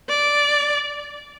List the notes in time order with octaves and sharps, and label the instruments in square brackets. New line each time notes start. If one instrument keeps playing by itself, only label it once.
[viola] D5